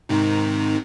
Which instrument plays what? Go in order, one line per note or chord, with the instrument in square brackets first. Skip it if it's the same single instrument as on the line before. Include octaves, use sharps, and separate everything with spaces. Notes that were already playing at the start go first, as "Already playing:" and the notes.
[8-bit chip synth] G#2 C3 D#3